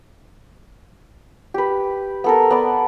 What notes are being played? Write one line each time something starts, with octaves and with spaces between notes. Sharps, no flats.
G4 B4
B3 A4 A#4
B3 D5